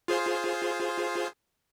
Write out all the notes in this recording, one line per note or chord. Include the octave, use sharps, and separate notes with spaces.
F4 G#4 C5